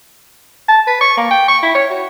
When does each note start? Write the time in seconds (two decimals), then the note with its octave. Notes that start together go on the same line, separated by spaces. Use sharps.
0.68 A5
0.87 B4
1.01 C#6
1.17 A#3
1.31 G5
1.48 C#6
1.62 E4
1.75 C#5
1.90 F#4